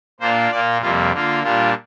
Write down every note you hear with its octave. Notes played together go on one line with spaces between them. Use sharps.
A#2 A#3 D4 F4 C5
A#2 A#3 F4 D5
F2 C3 G3 A#3 F4
D3 A#3 F4
A#2 G3 D4 F4